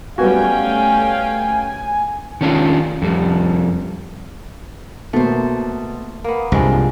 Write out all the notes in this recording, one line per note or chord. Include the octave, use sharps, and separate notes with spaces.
G3 A3 B3 C#4 F#4 F5 G5 G#5
D#3 C#4 D4 F4
F2 G3
B2 A3 A#3 C5
A#3 B3
C2 G2 F3 G#3 C4